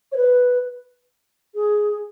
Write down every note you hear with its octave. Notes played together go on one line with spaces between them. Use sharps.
C#5
B4
G#4